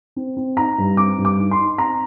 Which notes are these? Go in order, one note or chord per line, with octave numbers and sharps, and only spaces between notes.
C4
C4
D#4 A#5
G2
C4 D6
G2
D6
D#4
C6
D#4
C4 A#5